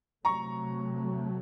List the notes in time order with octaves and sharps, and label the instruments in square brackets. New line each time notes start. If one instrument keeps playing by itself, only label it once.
[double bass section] C3 F#3 A3 [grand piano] A#5 C#6